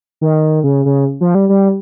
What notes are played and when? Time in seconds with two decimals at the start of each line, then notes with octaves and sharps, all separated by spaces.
0.21 D#3
0.64 C#3
0.85 C#3
1.21 F3
1.35 G3
1.49 G3